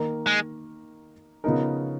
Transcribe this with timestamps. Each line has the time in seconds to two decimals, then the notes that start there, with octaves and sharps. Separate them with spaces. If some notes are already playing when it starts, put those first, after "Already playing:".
Already playing: D#3 A#3 D#4 A#4
0.27 G#3
1.44 C#3 F3 B3 D#4 A#4